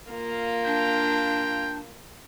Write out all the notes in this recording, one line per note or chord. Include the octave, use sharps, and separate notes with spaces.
A#3 F4
D4 G5